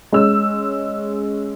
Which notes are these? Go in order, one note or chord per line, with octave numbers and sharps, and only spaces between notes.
G#3 C#4 E6